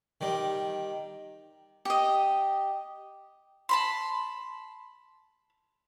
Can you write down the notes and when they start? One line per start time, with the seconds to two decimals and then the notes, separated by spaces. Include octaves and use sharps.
0.21 D#3 G3
1.85 G4 D#5
3.69 A5 B5 C6